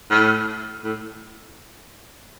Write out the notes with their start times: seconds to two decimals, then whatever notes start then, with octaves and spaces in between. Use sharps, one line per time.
0.11 A2
0.84 A2